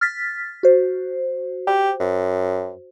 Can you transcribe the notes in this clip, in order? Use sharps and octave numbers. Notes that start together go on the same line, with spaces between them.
F6 A6 B6
F#4 C5
G4
F#2